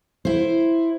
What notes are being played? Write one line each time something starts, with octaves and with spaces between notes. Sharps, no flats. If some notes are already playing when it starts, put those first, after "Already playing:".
E4 C5